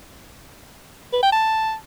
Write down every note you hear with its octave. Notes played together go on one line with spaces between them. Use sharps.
B4
G5
A5